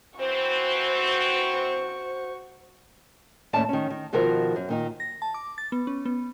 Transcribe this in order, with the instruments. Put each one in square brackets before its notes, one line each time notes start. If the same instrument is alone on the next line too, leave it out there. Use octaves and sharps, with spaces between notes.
[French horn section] E3 C4 [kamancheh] F#4 C#6 [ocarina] C5
[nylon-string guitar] D#2 A2 C#4 D5 E5 A5
D#3 C#4
D#3
B2 D#3 F3 F#4 A#4 C5
F#2
A#2 D#3 D#4
[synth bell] A#6
A5
D6
A6
B3
C#4
B3